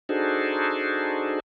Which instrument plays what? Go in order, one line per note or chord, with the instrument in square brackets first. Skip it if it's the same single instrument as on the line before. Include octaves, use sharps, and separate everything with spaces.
[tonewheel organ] D4 D#4 F#4 G#4 A4 C5